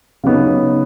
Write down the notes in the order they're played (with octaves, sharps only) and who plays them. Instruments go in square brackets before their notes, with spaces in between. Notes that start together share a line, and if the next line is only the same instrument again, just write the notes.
[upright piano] C#3 F#3 B3 D#4